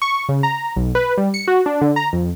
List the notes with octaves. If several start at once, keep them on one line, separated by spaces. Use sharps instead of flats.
C#6
C#3
A#5
B1
B4
G3
C#7
F#4
D4
D3
A#5
F2